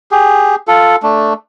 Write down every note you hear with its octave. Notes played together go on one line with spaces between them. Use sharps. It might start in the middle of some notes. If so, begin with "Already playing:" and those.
G4 G#4
F4 A4
A3 D4